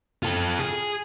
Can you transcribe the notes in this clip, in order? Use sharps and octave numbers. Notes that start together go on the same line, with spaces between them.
F4 A4
G#4